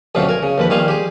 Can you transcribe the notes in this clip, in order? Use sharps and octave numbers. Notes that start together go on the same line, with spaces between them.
A1 D2 B2 F#3 C4 F4
A#4 G#5
C#3
D#2 F3 B4
A#1 D#3 G3 F4 F5 G#5
G4 G#4